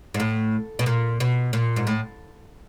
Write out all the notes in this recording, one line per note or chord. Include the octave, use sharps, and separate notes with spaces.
G#2
A2
B2
A#2
B2
A#2
G#2
A2